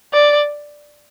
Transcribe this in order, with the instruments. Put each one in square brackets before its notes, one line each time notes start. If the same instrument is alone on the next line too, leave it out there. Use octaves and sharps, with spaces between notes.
[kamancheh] D5